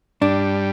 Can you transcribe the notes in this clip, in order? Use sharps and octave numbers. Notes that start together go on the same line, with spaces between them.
G2 G3 D4